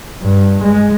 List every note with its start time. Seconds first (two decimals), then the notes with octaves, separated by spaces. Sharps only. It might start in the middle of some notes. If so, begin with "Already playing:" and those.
0.22 G2
0.63 G#3